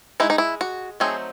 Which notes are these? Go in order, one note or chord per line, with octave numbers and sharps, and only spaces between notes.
G#3 D#4 E4
D#4
E4
F#4
F#3 A3 C4 D#4 G#4